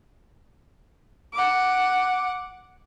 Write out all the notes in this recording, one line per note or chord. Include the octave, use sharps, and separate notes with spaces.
F#5 D6